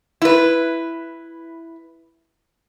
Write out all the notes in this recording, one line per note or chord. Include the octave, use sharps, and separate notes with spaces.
E4 B4